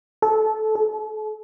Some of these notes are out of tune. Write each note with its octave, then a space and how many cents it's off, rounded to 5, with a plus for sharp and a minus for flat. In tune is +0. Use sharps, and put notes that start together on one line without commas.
A4 -15
A4 -40